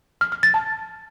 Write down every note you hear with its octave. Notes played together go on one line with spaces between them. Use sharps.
F6
F6
A6
A5